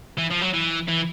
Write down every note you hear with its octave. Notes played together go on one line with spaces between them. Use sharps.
E3
F3
F#3
E3
E3